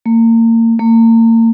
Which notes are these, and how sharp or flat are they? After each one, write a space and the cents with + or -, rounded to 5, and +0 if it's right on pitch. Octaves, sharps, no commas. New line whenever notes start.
A#3 -35
A#3 -40